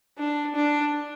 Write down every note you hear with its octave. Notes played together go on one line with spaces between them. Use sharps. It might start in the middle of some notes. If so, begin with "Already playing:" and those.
D4
D4